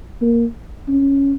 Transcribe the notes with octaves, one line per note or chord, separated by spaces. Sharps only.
A#3
C#4